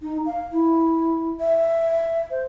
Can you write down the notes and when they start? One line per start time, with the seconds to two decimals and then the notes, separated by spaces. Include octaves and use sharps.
0.01 D#4
0.26 F5
0.52 E4
1.40 E5
2.30 C5